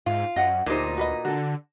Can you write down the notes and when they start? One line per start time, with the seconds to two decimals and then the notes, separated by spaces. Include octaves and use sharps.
0.06 G#2 F4
0.36 F#2 D#5 F#5
0.66 D2 A#2 D4 D#4 G4 C5
0.97 F#4 B4 D#5
1.25 D3 F#4 A4